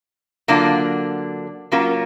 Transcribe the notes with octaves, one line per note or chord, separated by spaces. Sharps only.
D3 F#3 A#3 D4 F4
F#3 A#3 C#4 F4 A#4